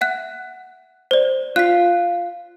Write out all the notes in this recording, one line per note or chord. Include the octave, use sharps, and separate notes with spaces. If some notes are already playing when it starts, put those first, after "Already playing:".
E5 F#5 F#6
C5 D5
F4 F#6 B6